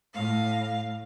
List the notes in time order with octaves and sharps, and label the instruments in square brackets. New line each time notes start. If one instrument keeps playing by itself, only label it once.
[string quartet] A2 F5